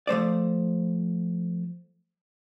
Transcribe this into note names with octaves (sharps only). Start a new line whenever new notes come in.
F3 A3 C5 D5